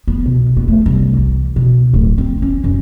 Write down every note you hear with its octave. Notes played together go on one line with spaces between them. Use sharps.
B3
B2
B3
A3
C2
E3
B2
D1
C4
C#4
F#2